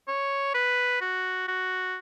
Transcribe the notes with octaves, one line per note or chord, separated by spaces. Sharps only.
C#5
B4
F#4
F#4